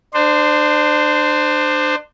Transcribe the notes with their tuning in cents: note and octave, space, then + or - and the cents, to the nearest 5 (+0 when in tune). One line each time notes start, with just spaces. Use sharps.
D4 +25 C5 -15